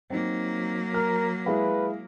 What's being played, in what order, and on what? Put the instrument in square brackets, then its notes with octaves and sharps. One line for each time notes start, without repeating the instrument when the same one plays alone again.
[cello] F#3 A#3 [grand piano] C4 D#4
[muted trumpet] A#4 [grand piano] F6
[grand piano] G#3 E4 F5 [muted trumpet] B4